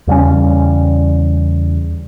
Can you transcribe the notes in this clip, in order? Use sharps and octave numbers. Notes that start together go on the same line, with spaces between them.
E2 C#3 G3 C#4